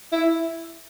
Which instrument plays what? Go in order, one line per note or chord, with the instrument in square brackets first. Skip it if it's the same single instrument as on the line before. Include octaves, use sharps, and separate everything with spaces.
[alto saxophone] E4